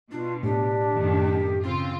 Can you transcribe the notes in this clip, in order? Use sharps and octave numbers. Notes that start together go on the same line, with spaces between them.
B2 D4 F4
A2 D4 G4
F#2 D#3 A3
C#3 C4 F4